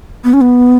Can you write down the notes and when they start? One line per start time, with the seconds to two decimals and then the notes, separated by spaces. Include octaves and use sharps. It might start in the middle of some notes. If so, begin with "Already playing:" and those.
0.24 B3
0.33 C#4
0.41 B3